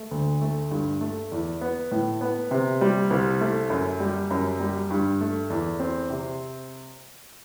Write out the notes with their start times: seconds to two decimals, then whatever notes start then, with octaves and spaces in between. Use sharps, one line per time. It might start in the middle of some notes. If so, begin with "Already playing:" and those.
Already playing: A3
0.11 D2
0.41 A3
0.71 G2
1.01 A3
1.31 E2
1.61 B3
1.91 A2
2.21 B3
2.51 C3
2.81 G3
3.10 C2
3.41 A3
3.70 F#2
4.00 G3
4.31 F#2
4.60 G3
4.90 G2
5.21 A3
5.50 E2
5.80 C4
6.10 C3